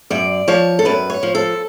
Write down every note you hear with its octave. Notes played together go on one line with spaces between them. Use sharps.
F#2 D5
F3 C#5
A4
F#2 B4
C#5
F3
A4